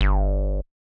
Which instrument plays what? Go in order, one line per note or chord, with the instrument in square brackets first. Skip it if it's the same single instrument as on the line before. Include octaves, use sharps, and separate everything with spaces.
[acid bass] G1